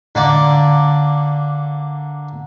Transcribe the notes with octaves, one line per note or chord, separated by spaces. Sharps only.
D3 A#3 D5